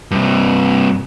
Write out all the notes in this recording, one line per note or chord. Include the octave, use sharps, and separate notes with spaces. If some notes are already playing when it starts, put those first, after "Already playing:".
G2 C3